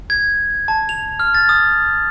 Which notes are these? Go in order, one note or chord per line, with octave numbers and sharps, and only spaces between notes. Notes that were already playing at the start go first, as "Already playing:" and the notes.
G#6
A5
F7
F6
A6
D#6